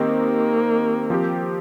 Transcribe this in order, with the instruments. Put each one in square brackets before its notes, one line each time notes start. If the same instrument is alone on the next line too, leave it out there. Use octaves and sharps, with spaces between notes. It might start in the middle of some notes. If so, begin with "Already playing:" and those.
Already playing: [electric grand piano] D#3 C4 G4 D#5 [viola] A#3
[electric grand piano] F3 C4 G4